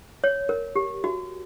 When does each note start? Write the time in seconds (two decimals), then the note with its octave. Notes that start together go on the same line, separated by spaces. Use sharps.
0.24 C#5
0.49 A#4
0.76 G4
1.04 F#4